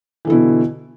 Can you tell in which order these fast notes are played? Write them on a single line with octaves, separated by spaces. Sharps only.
E3 D3 E4 B2